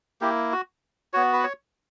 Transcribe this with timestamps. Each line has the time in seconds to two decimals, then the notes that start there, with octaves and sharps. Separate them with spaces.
0.21 A#3 E4 G4
0.52 F#4
1.13 B3 F#4 C#5
1.33 B4
1.44 C#5